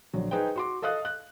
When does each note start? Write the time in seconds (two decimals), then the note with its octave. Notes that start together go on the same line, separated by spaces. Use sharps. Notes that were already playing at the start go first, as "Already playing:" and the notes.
0.13 A#1 D3 F#3
0.31 D#4 G#4 B4 C5 G5
0.56 F#4 C6 D6
0.82 A4 D#5 F5 D#6 F#6
1.05 F#6